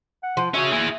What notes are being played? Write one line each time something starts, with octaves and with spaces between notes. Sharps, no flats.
F#5
F3
C#4 F#4 G#4 E5
A#3 E4 G#4